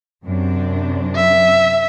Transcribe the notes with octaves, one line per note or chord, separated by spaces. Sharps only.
F#2 C3 D4
E5